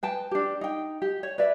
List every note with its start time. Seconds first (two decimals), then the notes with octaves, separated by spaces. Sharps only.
0.03 B4 G5 A5
0.31 D4 G4
0.61 D#4 G5
1.02 G4
1.23 C#5
1.38 B4 D5 E5